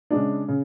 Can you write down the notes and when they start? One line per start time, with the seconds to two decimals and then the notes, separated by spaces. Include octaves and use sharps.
0.10 C#3 G#3 D4
0.48 C#3